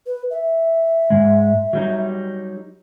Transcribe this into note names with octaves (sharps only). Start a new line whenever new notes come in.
B4
E5
G#2 C#3 G#3
F#3 G3 D#4